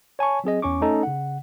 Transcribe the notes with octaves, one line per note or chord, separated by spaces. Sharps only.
C#5 G#5 A5 C#6
F#3 C4 G#4 D#5
E2 C#4 C#6 D6
A3 C#4 D#4 A4
C#3 F#5